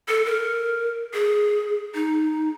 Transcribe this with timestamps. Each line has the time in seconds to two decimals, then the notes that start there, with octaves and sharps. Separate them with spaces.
0.08 A4
0.25 A#4
1.14 G#4
1.94 D#4